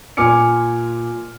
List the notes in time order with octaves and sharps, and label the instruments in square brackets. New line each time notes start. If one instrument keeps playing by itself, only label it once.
[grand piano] A#2 G#5 D6 F6 C#7